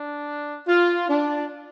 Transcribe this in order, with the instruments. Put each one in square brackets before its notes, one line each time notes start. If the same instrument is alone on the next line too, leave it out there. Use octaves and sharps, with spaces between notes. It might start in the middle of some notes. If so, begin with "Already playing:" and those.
Already playing: [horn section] D4
F4
D4